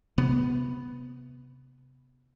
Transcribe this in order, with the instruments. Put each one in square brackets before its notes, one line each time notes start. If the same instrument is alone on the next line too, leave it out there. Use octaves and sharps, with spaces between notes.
[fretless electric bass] C3 B3